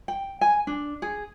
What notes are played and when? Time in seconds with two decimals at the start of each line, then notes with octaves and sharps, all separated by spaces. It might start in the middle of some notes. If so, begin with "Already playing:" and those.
0.08 G5
0.41 G#5
0.67 D4
1.02 G#4